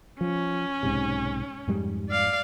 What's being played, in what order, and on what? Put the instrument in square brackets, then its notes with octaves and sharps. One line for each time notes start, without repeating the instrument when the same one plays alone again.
[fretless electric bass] F3 [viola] C#4
[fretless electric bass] B1 G#2 C3
F2 G#2 G3
[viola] D5 F5